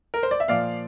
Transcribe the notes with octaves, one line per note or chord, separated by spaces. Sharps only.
A#4
C5
D5
E5
A#2 F3 D5 F5